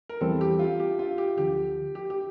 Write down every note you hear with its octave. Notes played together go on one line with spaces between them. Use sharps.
A#4
E2 E3 G3 C4 A4
G4
F4
G4
F4
G4
D2 D3 F3 G4
G4
G4